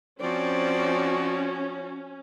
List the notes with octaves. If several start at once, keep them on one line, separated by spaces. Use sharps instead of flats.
F3 C4 C#4 F#4 D5